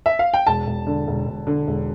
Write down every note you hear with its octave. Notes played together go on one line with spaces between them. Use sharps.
E5
F5
G5
E1 A5
E1
D3
E1
E1
D3
E1